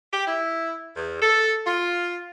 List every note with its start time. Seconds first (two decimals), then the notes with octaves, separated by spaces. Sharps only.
0.13 G4
0.27 E4
0.97 E2
1.22 A4
1.66 F4